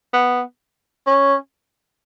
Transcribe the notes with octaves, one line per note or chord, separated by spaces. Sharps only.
B3
C#4